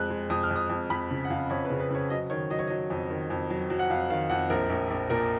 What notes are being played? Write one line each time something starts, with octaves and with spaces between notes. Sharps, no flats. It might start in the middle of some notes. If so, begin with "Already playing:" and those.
Already playing: F2 G#3 F#6
G#3
F2 D#6
F6
F2
D#6
F2
F2 B5
C#3
F#5
F2 F5
F2 C#5
B4
C#3
B4
C#3 C#5
F#3 D#5
D#3 C#5
F#3 D#5
C#5
F#3 D#5
F2
D#3
F2
F#3
F#3
F#5
F2 F5
D#3 F5
F2 F#5
A#1 A#4
A#1
A#1
A#2 A#4